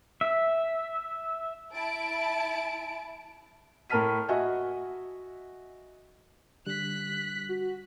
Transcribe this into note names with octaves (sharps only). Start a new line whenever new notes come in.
E5
E4 A5 D7
A2 A#4 A5 F6 B6 D#7
F#4 D#5 E5 F#5 G#5
D3 G3 F#6 B6
F#4